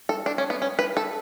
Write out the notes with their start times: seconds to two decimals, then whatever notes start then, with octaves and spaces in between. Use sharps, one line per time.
0.09 A4
0.26 D4
0.38 C#4
0.50 B3
0.62 C#4
0.79 B4
0.97 A4